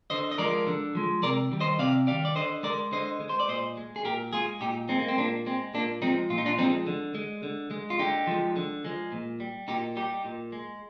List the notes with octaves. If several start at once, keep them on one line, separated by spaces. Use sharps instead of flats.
D3 C5 D#5
D#5
F3 G#3 A#4 D5
D3
F3 G#3
C3 A#4 D5
D#3 G3
C5 D#5
C3 D5 F5
D#3 G3 D5 F5
D5
D3 C5 D#5
G#3 A#4 D5
D3 C5 D#5
G#3
C5
D5
A#2 C5 D#5
G#3
G#4
A#2 G4 A#4
G#3 F4 G#4
A#2 D#4 G4
G#3 C4 D#4
A#3
C4
A#2 A#3 D4
G#3 C4
A#2 A#3 D4
F3 G#3 C4 D#4
A#2 F4
D#4
D4 F4
F3 G#3 C4 D#4
D3
G#3
D3
G#3
F4
D3 D#4 G4
F3 G#3
D3
F3 G#3
A#2
G3
A#2 D#4 G4
G3 D#4 G4
A#2
G#3